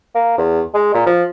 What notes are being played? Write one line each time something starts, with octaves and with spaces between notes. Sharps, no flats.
A#3
E2
G#3
A#2
F3